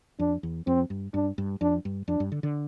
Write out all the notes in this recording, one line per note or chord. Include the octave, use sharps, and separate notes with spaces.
F2 D4
E2
F2 C4
G2
G2 D4
G2
F2 D4
G2
F2 D4
G2
D3
D3